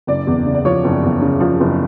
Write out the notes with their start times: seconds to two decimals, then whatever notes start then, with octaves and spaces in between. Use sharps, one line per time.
0.07 F#1 D5
0.27 E2
0.46 C#3
0.54 D5
0.65 F3 C#5
0.84 F#1
1.03 E2
1.22 C#3
1.40 F3
1.60 F#1